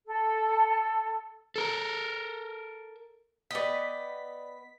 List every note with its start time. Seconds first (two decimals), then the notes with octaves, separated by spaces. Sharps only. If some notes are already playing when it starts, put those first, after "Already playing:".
0.06 A4
1.56 A4 A#4
3.51 B3 D5 D#5 G5 B6